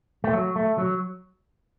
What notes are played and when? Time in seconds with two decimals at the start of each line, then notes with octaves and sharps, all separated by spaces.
0.24 A3
0.33 F#3
0.56 A3
0.78 F#3